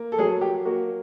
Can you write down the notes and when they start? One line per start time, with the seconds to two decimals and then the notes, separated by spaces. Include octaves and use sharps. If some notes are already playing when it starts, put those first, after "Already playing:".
Already playing: A#3
0.12 A4
0.19 F#3 G#4
0.41 G4
0.65 A#3 F#4